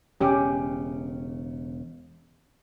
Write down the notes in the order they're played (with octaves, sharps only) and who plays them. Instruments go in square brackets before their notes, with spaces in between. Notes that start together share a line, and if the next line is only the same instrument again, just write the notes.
[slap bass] E1 C#3 [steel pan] C#4 G4